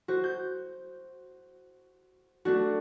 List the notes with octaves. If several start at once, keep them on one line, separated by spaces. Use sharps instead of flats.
F#4 C5
G6
A3 D4 F#4